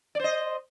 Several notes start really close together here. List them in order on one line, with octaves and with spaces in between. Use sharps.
D5 C5 D#5